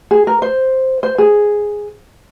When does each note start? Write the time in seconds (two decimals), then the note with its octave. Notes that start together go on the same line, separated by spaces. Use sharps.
0.11 G#4
0.27 A#4
0.42 C5
1.03 C5
1.18 G#4